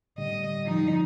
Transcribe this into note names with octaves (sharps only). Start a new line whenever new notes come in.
A2 D3 G3 D#5
F3 D#4